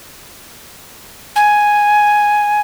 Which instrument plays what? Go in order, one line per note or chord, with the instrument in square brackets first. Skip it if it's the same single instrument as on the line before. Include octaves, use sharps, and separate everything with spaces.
[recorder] G#5